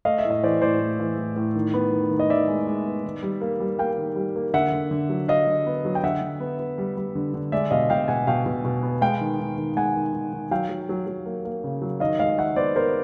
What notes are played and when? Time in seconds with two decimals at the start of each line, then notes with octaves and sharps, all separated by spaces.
0.05 A3 D#5 F5
0.18 E5
0.25 A2
0.31 D#5
0.43 E3 C5 D5
0.61 A2 C5 D5
0.80 A2
1.00 E3
1.18 A2
1.36 A2
1.55 D#3
1.74 B3
1.92 D#3
2.11 D#3
2.20 D#5
2.30 D#3 D5 E5
2.48 G#3
2.67 G#3
2.86 B3
3.05 D#3
3.23 G3
3.41 A#3
3.60 G3
3.79 A#3 F5 G5
3.98 D#3
4.16 G3
4.36 A#3
4.54 D3 E5 F#5
4.72 D3
4.91 D3
5.09 F#3
5.28 F#3 D#5 F5
5.47 D3
5.66 B3
5.85 F#3
5.95 G5
6.03 D3 E5 F#5
6.21 D3
6.40 B3
6.59 B3
6.78 G3
6.97 G3
7.15 D3
7.34 D3
7.52 G#3 D5 E5
7.71 B2 D#5 F5
7.90 B2 F5 G5
8.08 B2 F#5 G#5
8.27 B2 F5 G5
8.46 B2
8.65 B2
8.83 B3
9.01 G#3 F5 G5
9.21 D#3
9.40 D#3
9.58 D#3
9.76 G#3 F#5 G#5
9.96 D#3
10.14 D#3
10.33 D#3
10.51 F#3 F5 G5
10.69 F#3
10.89 F#3
11.07 F#3
11.26 A#3
11.45 A#3
11.64 C#3
11.82 F#3
12.00 D#3 D#5 F5
12.19 G#3 D#5 F5
12.38 D#3 E5 F#5
12.56 B3 C5 D5
12.76 B3 A#4 C5